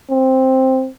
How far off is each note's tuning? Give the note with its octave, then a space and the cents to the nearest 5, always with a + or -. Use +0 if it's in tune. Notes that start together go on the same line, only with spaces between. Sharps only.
C4 +5